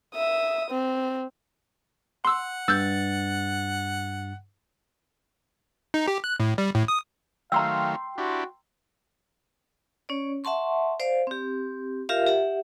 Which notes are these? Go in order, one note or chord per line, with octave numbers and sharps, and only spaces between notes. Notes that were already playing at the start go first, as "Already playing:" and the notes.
E5 D#6
C4
F#5 C6 E6
G2 E6 F#6 G6 A6
D#4
G4
F#6
A2
G3
A2
D#6
D#3 F#3 A3 F5 G5 A#5 C6 E6
D4 E4 F#4 G4
C#4 C#5 D5
E5 F#5 A5 C6 C#6
C5 D5 F5
C4 G4
F4 G4 A#4 E5 F5
G4 E5 F#5